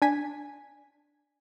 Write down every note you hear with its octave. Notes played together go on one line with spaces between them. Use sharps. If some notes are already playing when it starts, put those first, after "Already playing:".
D4 G#5 B6